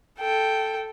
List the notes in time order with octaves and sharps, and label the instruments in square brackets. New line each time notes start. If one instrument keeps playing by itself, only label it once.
[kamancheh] A4 G5